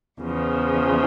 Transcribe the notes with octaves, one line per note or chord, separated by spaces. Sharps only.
E2 C#3 F3